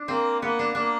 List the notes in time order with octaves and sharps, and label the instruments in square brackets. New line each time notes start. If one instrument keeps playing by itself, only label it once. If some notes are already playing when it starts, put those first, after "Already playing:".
Already playing: [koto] D4
[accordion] A#3 [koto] C4
[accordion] A#3 [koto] B3
[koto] D4
[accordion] A#3 [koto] D4